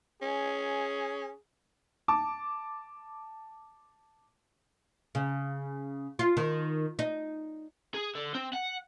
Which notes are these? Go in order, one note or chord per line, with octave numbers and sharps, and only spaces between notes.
C#4 G#4
A5 D6
C#3
F4
D#3
D#4
G#4
D3
C4
F#5